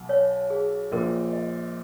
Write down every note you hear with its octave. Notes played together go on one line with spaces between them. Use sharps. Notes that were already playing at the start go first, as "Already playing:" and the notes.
Already playing: B1 B2
C#5
G#4
A#1 A#2 A#4
D#5